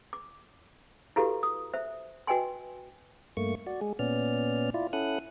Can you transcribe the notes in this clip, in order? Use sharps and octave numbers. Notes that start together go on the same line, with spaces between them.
D6
E4 F#4 G4 A4 B4 F5
D#6
C5 E5
F#4 B4 D#5 G5 G#5 C6
G2 A3 A#3 C#6
F#4 D5
G#3 G#4
A#2 B3 C#4 D5 F6
E4 F4 D5
C#4 E4 A4 F#5 D#6 F#6